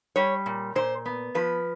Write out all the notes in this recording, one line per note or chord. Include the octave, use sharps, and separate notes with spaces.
G3 C#5
A#2
A#2 C5
B3
F3 B4